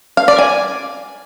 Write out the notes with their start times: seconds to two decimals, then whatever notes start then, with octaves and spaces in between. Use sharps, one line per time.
0.17 F5
0.28 D5
0.39 G#5